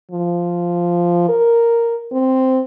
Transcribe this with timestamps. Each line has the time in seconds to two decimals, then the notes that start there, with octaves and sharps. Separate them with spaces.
0.11 F3
1.29 A#4
2.12 C4